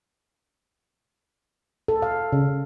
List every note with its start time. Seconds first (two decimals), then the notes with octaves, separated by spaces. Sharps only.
1.88 A4
2.02 F5
2.33 C#3